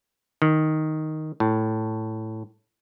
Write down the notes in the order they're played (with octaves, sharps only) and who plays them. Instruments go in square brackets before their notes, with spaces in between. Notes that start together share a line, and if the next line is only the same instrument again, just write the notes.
[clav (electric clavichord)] D#3
A2